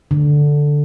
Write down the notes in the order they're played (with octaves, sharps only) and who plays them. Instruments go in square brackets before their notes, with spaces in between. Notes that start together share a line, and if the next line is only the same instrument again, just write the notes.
[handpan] D3